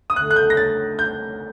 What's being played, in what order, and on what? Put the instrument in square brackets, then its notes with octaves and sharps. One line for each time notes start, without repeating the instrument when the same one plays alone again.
[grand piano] D#6
[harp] D2 D3 A3 [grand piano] F#6
[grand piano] F#6
G6
A#6
A6
G6